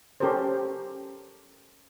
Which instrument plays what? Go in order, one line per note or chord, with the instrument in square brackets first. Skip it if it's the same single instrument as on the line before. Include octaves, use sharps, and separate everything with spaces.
[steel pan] C#4 G4 A4 A#4 C5